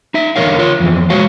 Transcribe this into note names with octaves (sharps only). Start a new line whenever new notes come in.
D#4 E5
E2 D3 F#3 A#4 C#5 F5
F4 C#5
F2 E3
G#3 F#4 C#5 F5